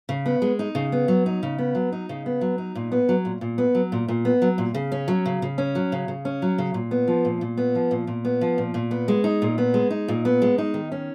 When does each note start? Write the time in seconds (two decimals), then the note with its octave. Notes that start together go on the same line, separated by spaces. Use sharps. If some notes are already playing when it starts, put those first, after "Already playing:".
0.09 C#3
0.26 B3
0.42 G#3
0.59 D#4
0.75 C#3
0.92 B3
1.08 F#3
1.26 D#4
1.43 C#3
1.58 B3
1.75 F#3
1.92 D#4
2.09 C#3
2.26 B3
2.41 F#3
2.58 D#4
2.75 A#2
2.92 B3
3.09 F#3
3.25 A#2
3.41 A#2
3.58 B3
3.75 F#3
3.92 A#2
4.08 A#2
4.25 B3
4.42 F#3
4.58 A#2
4.74 C#3
4.92 C#4
5.08 F#3
5.26 C#3
5.42 C#3
5.58 C#4
5.75 F#3
5.92 C#3
6.08 C#3
6.25 C#4
6.42 F#3
6.58 C#3
6.74 A#2
6.91 B3
7.08 F3
7.25 A#2
7.41 A#2
7.57 B3
7.75 F3
7.91 A#2
8.07 A#2
8.25 B3
8.41 F3
8.58 A#2
8.74 A#2
8.91 B3
9.08 G#3
9.24 D#4
9.42 A#2
9.58 B3
9.74 G#3
9.91 D#4
10.08 A#2
10.25 B3
10.42 G#3
10.58 D#4
10.74 D#3
10.92 C#4